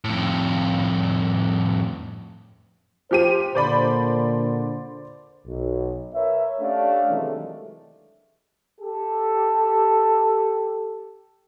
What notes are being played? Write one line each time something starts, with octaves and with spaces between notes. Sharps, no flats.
F2 A2
F3 G4 C5 D#7
A#2 D3 C5 D5 B5
B1
A#4 B4 C#5 E5
A3 C#4 D4 G4 D5 F5
C3 D#3 E3 F#3 G#3 A3
G4 A4